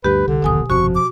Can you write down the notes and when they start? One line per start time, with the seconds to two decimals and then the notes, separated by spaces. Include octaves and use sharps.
0.04 D2 G2 G4 B4
0.28 C2 D3
0.42 D1 A#1 D#2 B2 G#5 D#6
0.70 G1 F2 C3 F3 F#4 C#6
0.95 D6